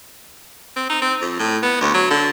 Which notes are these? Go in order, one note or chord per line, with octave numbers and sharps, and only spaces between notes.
C4
D#4
C4
F2
A2
B3
D2
F#3
D3